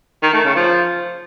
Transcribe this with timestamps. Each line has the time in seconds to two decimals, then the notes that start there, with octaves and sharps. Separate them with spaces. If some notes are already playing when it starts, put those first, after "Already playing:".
0.23 D#3
0.34 A3
0.45 C#3
0.56 F3